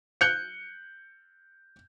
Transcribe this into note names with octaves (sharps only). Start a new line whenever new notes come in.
F#6 G6 C#7